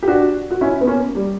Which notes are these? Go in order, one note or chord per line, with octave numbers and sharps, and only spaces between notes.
G4
D4 F#4
F#4
C#4 E4
B3
A#3 C#4
G3